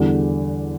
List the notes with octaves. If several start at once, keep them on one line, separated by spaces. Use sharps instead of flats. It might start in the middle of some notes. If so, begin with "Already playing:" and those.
Already playing: E2 D3 G3